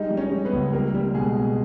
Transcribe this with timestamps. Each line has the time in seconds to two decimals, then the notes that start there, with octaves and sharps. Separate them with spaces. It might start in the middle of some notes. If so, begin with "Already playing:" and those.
Already playing: G3 G#3 D#4 D#5
0.11 G3
0.17 C#4 C#5
0.32 G3
0.45 B3 B4
0.53 C#2
0.73 G3 A#3 A#4
0.94 G3
1.15 B2 G#3 G#4
1.36 B2